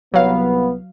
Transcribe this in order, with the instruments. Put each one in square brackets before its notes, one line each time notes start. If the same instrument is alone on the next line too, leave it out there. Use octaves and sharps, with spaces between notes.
[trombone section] C2 B3 [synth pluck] F#3 F5